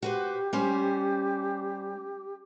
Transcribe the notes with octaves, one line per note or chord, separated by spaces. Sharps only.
F#4 G4 B4 C5
G3 C#4 C5